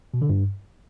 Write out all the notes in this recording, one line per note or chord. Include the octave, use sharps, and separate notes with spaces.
B2
D3
G2